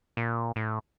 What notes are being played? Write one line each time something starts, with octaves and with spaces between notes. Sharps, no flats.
A#2
A2